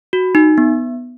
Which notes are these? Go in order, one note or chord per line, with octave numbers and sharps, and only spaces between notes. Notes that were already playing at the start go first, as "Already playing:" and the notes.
F#4
D#4
B3